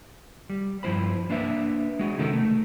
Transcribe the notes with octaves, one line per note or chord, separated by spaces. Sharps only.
G3
G2 F3 E4 F4 C5 B5
A#3 D4 B4 E5
G#3 F#4 G#4
C3 D#3 C#4 D#4 A4 A#4
A3